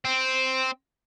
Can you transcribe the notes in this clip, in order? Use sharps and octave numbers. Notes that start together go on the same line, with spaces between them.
C4